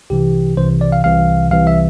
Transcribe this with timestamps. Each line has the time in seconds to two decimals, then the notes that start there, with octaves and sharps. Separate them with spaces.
0.10 C2 C3 E3 G4
0.57 C2 C3 E3 C5
0.81 D5
0.92 F5
1.04 C2 C3 E3 F5
1.51 C2 C3 E3 F5
1.67 E5